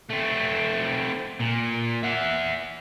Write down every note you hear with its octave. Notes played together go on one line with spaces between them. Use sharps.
A3 C4
A#2
E5 F#5